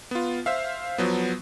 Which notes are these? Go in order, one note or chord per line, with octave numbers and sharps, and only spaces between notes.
B3 F4
C5 E5 F5
F3 F#3 B3